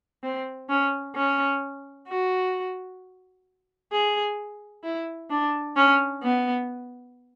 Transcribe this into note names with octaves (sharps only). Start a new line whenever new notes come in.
C4
C#4
C#4
F#4
G#4
E4
D4
C#4
B3